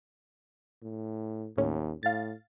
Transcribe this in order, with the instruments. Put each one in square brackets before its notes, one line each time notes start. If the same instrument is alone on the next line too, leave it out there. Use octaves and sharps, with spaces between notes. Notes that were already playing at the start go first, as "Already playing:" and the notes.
[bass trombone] A2
[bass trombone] D#2 [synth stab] A2 C#4
[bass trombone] A2 [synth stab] F5 A6